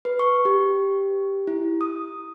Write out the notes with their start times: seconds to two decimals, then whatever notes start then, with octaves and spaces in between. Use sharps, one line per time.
0.05 B4
0.19 C#6
0.45 G4
1.47 E4
1.81 D#6